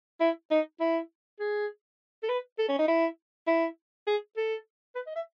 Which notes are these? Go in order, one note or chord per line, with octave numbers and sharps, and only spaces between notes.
E4
D#4
E4
G#4
A4
B4
A4
C#4
D#4
E4
E4
G#4
A4
B4
D#5
E5